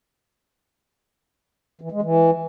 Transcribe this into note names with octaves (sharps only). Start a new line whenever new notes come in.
E3
G#3
E3